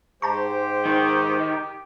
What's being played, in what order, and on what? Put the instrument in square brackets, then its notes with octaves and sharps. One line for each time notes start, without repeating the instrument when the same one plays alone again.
[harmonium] G#2 G#3 C5 [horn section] G4 [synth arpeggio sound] A5 A#5 C#6
[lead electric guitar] D#3